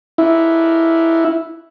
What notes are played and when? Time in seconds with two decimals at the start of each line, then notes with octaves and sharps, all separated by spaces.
0.18 E4